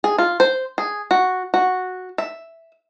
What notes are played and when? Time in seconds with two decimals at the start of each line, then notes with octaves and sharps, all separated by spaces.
0.04 G#4
0.18 F4
0.40 C5
0.78 G#4
1.11 F#4
1.54 F#4
2.18 E5